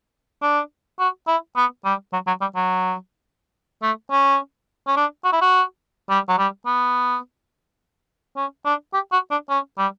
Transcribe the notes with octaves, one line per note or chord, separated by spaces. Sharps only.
D4
F#4
E4
B3
G3
F#3
F#3
G3
F#3
A3
C#4
C#4
D4
F#4
E4
F#4
G3
F#3
G3
B3
C#4
D4
G4
F#4
D4
C#4
G3